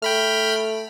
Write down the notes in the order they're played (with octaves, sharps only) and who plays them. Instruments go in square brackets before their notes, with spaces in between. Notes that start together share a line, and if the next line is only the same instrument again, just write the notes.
[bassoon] A3 [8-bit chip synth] G5 B5 F6